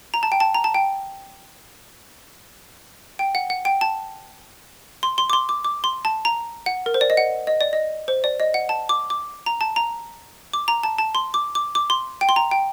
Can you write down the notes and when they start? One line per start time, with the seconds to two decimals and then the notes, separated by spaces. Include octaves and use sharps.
0.14 A#5
0.23 A5
0.32 G5
0.40 A5
0.54 A#5
0.64 A5
0.74 G5
3.19 G5
3.35 F#5
3.50 F#5
3.65 G5
3.81 A5
5.03 C6
5.18 C6
5.30 D6
5.33 C6
5.49 D6
5.64 D6
5.84 C6
6.05 A5
6.25 A#5
6.66 F#5
6.86 A#4
6.94 C5
7.01 D5
7.10 D#5
7.17 F#5
7.47 D#5
7.61 D5
7.73 D#5
8.08 C5
8.24 D5
8.40 D#5
8.54 F#5
8.69 A5
8.89 D6
9.10 D6
9.46 A#5
9.61 A5
9.76 A#5
10.53 D6
10.68 A#5
10.83 A5
10.98 A5
11.15 C6
11.34 D6
11.55 D6
11.75 D6
11.90 C6
12.21 G5
12.29 C6
12.36 A#5
12.51 G5